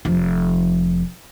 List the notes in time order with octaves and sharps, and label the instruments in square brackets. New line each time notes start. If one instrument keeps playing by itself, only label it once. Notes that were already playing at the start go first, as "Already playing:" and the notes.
[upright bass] F1 F3